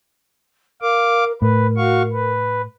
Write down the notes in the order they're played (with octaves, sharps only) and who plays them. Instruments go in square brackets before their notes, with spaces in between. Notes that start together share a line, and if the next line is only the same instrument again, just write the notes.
[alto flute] A#4 [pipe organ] F5 D6
[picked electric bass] A2 [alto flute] A#4 [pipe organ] B4
[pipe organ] F#4 F5 C#6
B4